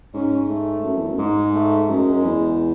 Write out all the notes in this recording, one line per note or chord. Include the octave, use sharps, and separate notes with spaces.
G#2 C#4
A3
F#2
E2
F#2
G#2 G#3
A3
F#2 G#3
F#2
E2